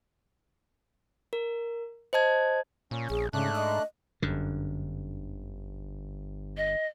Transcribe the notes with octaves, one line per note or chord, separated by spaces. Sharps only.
A#4
C5 D#5 A5 G#6
A#2 C#4
A#1 G#4
G#2 C#3 A3 D4 F#6
D#5
G1 F#2 D3
D#5